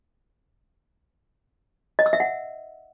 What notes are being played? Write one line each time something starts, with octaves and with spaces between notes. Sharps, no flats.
D#5
E6
E5
F#5